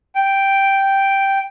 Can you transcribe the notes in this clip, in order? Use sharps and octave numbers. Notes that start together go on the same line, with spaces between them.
G5